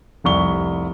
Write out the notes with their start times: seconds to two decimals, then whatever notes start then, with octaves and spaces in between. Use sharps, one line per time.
0.24 F1 C2 C#6 G7